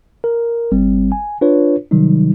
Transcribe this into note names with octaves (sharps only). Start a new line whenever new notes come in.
A#4
G1 G3 C4
G#5
D4 F4 B4 C#5
C3 D#3 F#3 G3 D#4